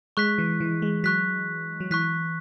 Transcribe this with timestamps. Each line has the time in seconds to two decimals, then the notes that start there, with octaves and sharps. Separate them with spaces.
0.17 G#3 C#6 F#6 B6
0.38 E3
0.60 E3
0.82 G#3
1.04 F#3 C#6 F#6 B6
1.80 F#3
1.91 E3 C#6 F#6 B6